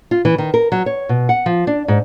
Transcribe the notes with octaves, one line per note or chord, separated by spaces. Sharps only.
F4
E3
D#3
A#4
F#3
C#5
B2
F#5
F3
D4
G#2